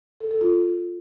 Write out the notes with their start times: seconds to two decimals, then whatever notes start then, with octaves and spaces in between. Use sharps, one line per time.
0.20 A4
0.31 A4
0.41 F4